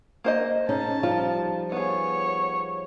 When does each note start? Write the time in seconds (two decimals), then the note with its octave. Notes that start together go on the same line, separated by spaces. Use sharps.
0.24 A#3 C5 D#5
0.69 C#3 C#4 D#4 A5
1.03 F3 G3 D#4 F4
1.72 B3 G#4 C#5